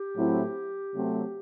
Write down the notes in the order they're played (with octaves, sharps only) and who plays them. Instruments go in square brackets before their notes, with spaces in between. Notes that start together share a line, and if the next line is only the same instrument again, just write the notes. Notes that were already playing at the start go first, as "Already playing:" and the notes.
Already playing: [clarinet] G4
[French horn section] A2 F#3 C4 E4
C3 F#3 A3 C4